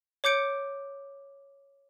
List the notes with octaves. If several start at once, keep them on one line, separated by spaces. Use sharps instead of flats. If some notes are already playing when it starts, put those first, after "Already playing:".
C#5 D6 G6 C#7 D7